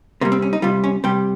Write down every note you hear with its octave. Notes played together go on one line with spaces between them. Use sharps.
C3 G3 A#3
C4
C#4
D#4
C3 G3 F4
C#4
C3 G3 G4